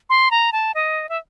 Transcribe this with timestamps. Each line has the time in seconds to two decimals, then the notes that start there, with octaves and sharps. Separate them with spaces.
0.10 C6
0.31 A#5
0.52 A5
0.75 D#5
1.09 E5